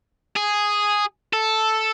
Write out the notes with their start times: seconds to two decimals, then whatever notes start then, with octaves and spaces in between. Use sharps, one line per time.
0.36 G#4
1.33 A4